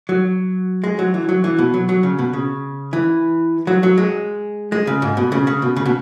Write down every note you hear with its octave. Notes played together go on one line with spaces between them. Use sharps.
F#3
G#3
F#3
E3
F#3
E3
B2
F#3
F#3
C#3
B2
C#3
E3
F#3
F#3
G#3
G#3
C#3
G#2
B2
C#3
C#3
B2
C#3
B2